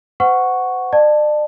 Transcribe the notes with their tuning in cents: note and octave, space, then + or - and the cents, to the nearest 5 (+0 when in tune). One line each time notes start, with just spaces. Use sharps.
C5 -40 F#5 +0 C#6 +0
D5 +40 A5 +0